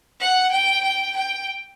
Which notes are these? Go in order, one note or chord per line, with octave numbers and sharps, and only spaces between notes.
F#5
G5
G5
G5